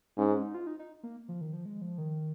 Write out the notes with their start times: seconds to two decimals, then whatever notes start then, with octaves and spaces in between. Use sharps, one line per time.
0.18 G#2 C#4
0.30 C#4
0.42 D#4
0.54 F4
0.67 D#4
0.79 D#4
1.03 A#3
1.29 F3
1.41 D#3
1.53 F3
1.66 G#3
1.82 F3
1.98 D#3